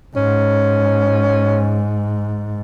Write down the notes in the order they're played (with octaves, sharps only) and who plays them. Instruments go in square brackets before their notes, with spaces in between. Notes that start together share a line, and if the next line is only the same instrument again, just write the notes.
[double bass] G#2 [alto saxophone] C#4